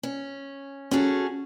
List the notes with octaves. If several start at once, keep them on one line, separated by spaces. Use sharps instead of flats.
C#4
C#4 F#4 G#4 A4